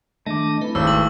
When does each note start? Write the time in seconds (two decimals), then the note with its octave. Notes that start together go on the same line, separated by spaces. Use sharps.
0.27 D#3 A3 D4 D#5 D6
0.62 A3 C4 E4 B4
0.75 G#1 E6
0.87 C#6 F#7